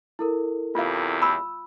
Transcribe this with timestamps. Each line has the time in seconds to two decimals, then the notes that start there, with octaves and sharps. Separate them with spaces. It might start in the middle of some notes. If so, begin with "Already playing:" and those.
0.19 E4 A4 A#4
0.75 E2 C3 F4 F5
1.22 B5 E6